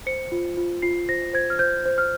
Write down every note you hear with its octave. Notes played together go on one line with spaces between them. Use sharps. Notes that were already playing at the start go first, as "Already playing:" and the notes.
C5 C#7
F4
F4
F4 C7
C5 A#6
C5 G#6
F6
C5 G6
C5
F6